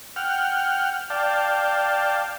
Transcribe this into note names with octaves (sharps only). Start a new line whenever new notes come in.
F#5 G5 F6
D5 F5 G5 A5